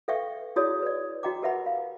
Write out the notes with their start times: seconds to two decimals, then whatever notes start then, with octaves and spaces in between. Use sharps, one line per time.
0.08 A4 B4 E5 F5 G5 C#6
0.56 E4 F#4 G#4 C#5 D5 D#6
0.83 B4 D5
1.23 F#4 D#5 G5 A#5 D6
1.42 G4 A#4 B4 E5 F#5 B5
1.66 F5